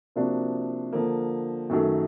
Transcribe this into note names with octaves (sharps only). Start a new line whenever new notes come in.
C3 F3 A#3 D4 F#4
D3 F3 A#3
F#2 D#3 F#3 A3